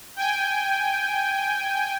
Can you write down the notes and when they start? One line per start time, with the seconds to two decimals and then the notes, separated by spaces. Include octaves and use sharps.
0.16 G5 G#5